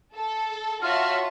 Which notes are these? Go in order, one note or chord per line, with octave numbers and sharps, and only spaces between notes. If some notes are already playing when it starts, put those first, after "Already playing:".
A4
F4 F#4 C#5 E5 A5 F6